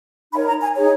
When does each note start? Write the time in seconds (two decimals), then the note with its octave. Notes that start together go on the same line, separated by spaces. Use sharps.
0.33 D#4 A#4 C#5 B5
0.47 A#5
0.61 G#5
0.76 D#4 G#4 C#5